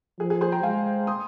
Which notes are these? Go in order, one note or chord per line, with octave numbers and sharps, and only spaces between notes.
F3 G#4
G#4
G#4 C5
G5 A#5
G#3 F5 G#5
C6 D#6